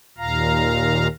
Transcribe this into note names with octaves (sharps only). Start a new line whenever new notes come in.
D#2 A#2 F5 A#5